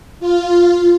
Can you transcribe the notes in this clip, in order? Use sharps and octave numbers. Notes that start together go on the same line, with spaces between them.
F4